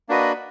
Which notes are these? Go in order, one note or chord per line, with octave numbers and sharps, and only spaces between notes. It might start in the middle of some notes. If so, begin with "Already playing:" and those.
A#3 D4 F#4 B4 D#5